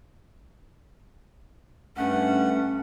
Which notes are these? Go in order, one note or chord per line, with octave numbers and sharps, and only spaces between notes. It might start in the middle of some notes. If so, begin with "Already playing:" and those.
G2 A3 C#4 F#5